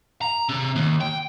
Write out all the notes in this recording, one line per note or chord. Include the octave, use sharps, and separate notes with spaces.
A#5
C3
D#2
G5